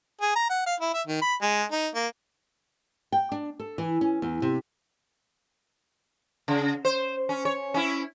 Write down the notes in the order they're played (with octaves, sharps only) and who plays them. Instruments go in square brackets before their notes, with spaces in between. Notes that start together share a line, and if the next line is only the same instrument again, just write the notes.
[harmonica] G#4
A#5
F#5
F5
E4
E5
D#3
B5
G#3
D#4
A#3
[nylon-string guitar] G5
D4
A4
E3
C#4
E2
C3
[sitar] C#3
C5
C#4
C#5
C#4 E4